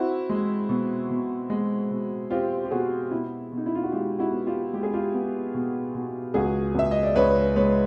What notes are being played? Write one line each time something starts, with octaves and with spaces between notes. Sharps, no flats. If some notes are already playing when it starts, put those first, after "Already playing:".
Already playing: C4 E4 F#4
G#3
B2
B2
G#3
B2
C4 F4 G4
G4
B2 F#4 G#4
B2 E4
B2
D#4
E4
F4
F#4
G#3 F4 G4
E4 F#4
B3
F4 G4
G#3 G4
G#4
F4 G4
B3
B2
B2
C#2 F#4 G#4
C#2 E5
D#5
D5
C#2 B4 C#5
G#3 B4 C#5